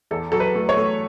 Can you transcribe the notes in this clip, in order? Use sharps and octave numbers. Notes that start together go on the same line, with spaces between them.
E2 A4
F#3 A4
B4
A3
C#5
A3